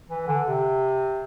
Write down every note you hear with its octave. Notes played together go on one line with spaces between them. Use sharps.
E3
D3
C3